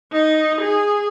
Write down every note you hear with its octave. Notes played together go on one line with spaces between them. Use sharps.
D#4
G#4